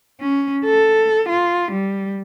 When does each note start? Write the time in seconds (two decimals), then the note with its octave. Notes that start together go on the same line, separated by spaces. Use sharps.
0.21 C#4
0.65 A4
1.29 F4
1.72 G3